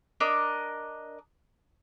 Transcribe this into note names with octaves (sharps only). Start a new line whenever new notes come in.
D4 A#4 D#5